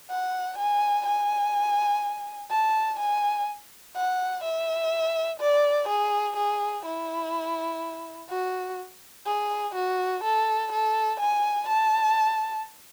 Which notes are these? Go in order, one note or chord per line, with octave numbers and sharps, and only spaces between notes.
F#5
G#5
G#5
A5
G#5
F#5
E5
D5
G#4
G#4
E4
F#4
G#4
F#4
A4
A4
G#5
A5